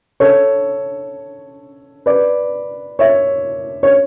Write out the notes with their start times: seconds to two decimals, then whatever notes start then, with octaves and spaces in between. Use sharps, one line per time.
0.20 A4 C#5
2.06 B4 D5
2.99 C#5 E5
3.83 C#5